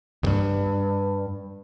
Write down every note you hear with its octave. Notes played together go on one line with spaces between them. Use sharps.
E2 G2